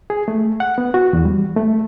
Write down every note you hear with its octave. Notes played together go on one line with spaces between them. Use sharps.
G#4
A3
F#5
B3
F#4
E2
G3
A3